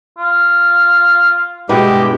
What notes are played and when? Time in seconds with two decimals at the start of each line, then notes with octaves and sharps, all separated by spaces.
0.18 F4
1.69 G2 B2 G#3 E4 G4